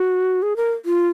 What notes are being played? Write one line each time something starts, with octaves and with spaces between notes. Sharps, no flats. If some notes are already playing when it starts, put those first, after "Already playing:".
Already playing: F#4
G#4
A#4
F4